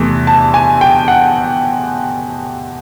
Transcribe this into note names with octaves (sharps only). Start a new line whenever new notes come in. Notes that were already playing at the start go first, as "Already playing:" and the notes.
Already playing: E2 C3 E3 A3
A5
G#5
G5
F#5